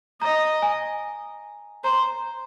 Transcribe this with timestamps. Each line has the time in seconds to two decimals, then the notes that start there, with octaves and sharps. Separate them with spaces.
0.22 D#5 A#5
0.62 G#5
1.84 C5 A#5